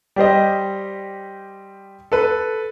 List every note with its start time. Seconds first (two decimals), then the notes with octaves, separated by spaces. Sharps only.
0.16 G3 G4 C5 D#5
2.12 A4 B4